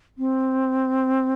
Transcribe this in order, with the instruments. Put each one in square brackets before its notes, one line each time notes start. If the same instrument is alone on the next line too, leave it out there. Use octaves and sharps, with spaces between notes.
[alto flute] C4